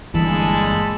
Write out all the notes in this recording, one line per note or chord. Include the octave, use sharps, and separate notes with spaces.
G1 G2 A#2 E3 G#3 A4 A5 B5